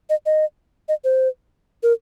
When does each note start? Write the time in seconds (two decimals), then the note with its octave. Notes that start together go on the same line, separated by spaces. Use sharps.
0.10 D#5
0.26 D#5
0.89 D#5
1.04 C5
1.83 A#4